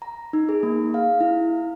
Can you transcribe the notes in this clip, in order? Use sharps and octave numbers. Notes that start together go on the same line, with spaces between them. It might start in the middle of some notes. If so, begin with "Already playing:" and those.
A#5
D#4
G#4
A#3
F5
E4